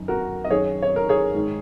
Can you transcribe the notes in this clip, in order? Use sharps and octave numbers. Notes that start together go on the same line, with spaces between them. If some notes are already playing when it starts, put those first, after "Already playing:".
Already playing: F#2 D#3
F#4 A#4
D#5
F#2 D#3 G#4 C#5
C#5
A#4
G#4 C#5
G#2 D#3